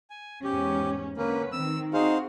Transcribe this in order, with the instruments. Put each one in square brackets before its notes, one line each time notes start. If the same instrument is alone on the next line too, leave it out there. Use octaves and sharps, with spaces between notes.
[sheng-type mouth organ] G#5
[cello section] E2 G#2 C#4 [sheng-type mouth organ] G4
[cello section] D3 C#4 B4 [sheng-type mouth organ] A#3
[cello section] D#3 C4 [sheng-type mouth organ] E6
[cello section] C4 F#4 [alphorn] D#4 [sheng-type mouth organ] G#4 C5 F5